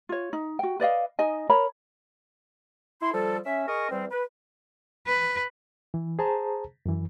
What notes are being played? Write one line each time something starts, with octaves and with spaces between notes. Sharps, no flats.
F4 C#5
D#4
F#4 G5
B4 D5 D#5 F5
D#4 D#5 G#5
A#4 C#5 A#5 B5
E4 C6
F3 G3 A4
C#4 E5
G#4 A#4 D#5 C#6
E2 G3 C4
B4
B4
E3
G#4 C5 A5 A#5
F#2 E3